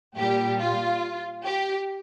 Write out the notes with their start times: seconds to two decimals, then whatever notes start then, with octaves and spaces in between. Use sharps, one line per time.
0.18 A#2 G3 G4
0.60 F4
1.44 G4